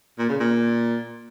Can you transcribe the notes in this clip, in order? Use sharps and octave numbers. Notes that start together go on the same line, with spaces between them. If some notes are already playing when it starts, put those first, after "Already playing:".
A#2
C#3
A#2